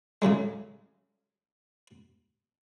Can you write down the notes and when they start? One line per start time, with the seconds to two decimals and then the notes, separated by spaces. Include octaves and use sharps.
0.22 A2 C#3 F#3 G#3